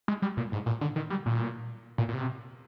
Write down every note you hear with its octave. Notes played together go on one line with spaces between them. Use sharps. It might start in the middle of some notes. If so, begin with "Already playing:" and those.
G#3
G3
A#2
G#2
A#2
D3
D#3
G3
A#2
A#2
A#2
C3